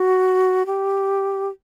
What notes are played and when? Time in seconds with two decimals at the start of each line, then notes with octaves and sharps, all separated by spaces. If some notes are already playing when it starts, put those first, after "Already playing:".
Already playing: F#4
0.66 G4